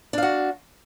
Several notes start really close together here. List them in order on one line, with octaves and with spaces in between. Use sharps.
D4 F5 F#4